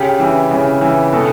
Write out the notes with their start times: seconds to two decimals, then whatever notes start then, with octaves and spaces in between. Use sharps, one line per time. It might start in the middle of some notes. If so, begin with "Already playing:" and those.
Already playing: C#3 G4
0.20 E3
0.51 C#3
0.81 E3
1.13 B2 A4